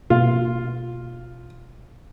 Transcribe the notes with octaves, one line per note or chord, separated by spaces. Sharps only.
B2 A#3 F4